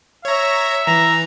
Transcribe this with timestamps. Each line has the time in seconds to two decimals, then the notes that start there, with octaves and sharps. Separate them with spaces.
0.25 C#5 E5 A#5
0.87 E3 A#5